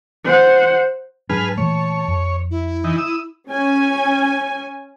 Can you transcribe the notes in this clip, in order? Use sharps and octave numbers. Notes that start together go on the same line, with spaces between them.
C5 F#5
G#2 F#3 D4 G#4 B4 A5 F6
A#2 E3 A3 C#5
F2
E4
E3 D#4
D#6 E6
C#4 G#5